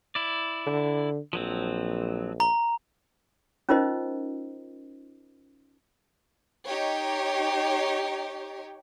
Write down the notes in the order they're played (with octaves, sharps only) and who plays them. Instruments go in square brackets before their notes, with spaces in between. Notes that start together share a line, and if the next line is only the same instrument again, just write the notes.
[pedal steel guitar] E4 D5
[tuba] D3
[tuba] A#1 [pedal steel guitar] F3 F#3 C4
[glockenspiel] A#5
[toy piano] C#4 D#4 F4 A#4 C5 D#5
[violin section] D#4 G4 C#5